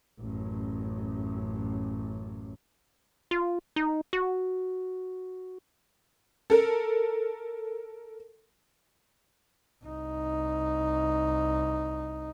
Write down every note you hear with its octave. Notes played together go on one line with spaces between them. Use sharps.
A1 F#2
F4
D#4
F#4
A4 A#4
C2 D#4